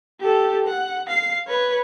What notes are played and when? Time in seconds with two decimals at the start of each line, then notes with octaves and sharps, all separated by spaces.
0.20 G4 A4
0.66 F#5
1.07 F5 C7
1.47 B4 C#5